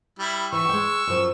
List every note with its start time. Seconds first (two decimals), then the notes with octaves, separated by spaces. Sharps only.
0.19 G3 E4
0.52 E3 C#6 E6
0.69 G#3 G5
1.07 F#2 F3